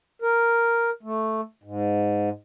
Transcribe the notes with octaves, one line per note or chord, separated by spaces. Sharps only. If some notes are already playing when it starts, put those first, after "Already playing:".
A#4
A3
G#2